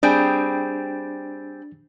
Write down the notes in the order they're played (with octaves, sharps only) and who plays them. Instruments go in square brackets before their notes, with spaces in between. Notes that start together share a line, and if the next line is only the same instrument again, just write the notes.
[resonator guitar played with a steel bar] G3 C4 G#4 [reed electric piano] D4